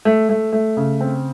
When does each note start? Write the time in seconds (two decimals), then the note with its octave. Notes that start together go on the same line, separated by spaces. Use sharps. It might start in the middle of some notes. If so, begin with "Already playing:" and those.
0.05 A3
0.29 A3
0.53 A3
0.77 C#3
1.01 C4